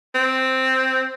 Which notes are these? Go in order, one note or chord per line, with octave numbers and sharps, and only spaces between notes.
C4